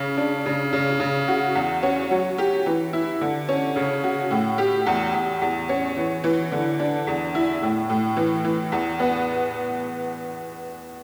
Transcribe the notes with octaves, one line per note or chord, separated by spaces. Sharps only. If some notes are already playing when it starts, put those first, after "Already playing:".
Already playing: C#3
D4
C#3
C#3
C#3
F#4
E2
C#4
F#3
G4
E3
E4
D3
C#4
C#3
F#4
A2
G4
E2
E2
E2
C#4
E3
E3
D3
D4
E2
E4
A2
A2
E3
E3
E2
B3